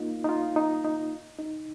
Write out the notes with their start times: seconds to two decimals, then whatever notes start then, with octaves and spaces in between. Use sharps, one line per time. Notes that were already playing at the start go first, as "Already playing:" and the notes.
Already playing: A#3 D#4 F4
0.24 D#4
0.29 F4
0.56 D#4
0.84 D#4
1.39 D#4